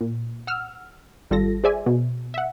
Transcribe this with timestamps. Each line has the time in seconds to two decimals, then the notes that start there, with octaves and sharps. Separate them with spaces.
0.01 A#2
0.47 F#5 E6 F6
1.30 G#1 G3 F4 A4 A#6
1.64 G#4 C5 D5 E5 G#5
1.86 B2
2.34 E5 F#5